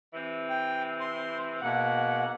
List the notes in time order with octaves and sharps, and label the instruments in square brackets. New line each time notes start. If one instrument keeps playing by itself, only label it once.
[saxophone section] C3 E3 C4
[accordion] G5
C6
[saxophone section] G#2 F#5 [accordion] B2 A#3